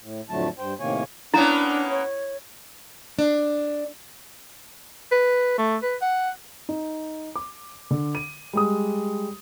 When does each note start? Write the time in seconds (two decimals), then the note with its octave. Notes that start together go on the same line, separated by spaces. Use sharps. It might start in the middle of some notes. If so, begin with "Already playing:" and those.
0.03 A2
0.30 F2 A2 D3 F#3 A3 A5
0.58 G2 C5 G5
0.80 A2 C3 D#3 A#3 C#5 G#5
1.34 A#3 B3 C#4 D4 E4 A#5
1.90 C#5
3.19 D4
5.12 B4
5.58 A3
5.83 B4
6.02 F#5
6.69 D#4
7.36 D6
7.91 D3
8.15 D#7
8.53 G3 G#3 D#6